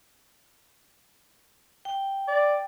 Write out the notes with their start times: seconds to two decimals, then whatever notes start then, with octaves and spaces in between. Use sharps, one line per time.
1.85 G5
2.28 D5